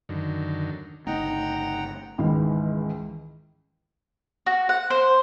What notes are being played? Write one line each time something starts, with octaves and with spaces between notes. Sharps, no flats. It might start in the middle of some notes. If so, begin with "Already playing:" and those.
F#2 D3 D#3
G1 C#3 A3 D#4 F#5 G5 A#5
C#2 G#2 D#3 E3
F#4
F#5
C5